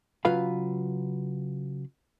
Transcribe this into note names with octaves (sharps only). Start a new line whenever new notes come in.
C#3 F#3 F4 B4 F5 B5